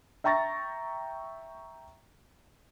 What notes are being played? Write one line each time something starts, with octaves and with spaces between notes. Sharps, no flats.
E5 G5 A#5 C#6 A6 A#6